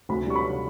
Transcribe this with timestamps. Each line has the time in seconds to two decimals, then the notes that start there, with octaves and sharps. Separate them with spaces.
0.09 D2 B5
0.27 G3 C#6
0.36 B5